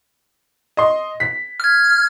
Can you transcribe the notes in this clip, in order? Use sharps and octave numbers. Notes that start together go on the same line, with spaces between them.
D#5 C6
B6
F6 G#6